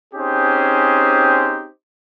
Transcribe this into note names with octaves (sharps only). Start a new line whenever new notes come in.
C4 C#4 D#4 G4 G#4 C5